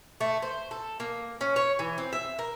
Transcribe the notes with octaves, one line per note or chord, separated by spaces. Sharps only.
A3
C5
A4
A#3
C#4
C#5
E3
C4
E5
A#4